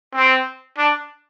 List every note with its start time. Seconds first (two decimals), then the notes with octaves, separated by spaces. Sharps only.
0.15 C4
0.78 D4